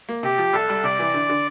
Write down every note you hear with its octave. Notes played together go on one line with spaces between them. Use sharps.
A#3
C3 G4
F3
C2 A4
G3
C3 D5
E3
D3
D3